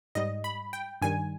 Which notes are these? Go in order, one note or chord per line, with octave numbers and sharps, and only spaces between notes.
G#2 G3 D#5
B5
G5
G2 D#3 G3 G#5